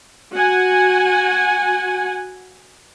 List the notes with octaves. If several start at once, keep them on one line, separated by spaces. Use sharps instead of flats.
F#4 F#5 G#5